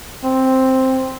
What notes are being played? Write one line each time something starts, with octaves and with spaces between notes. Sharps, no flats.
C4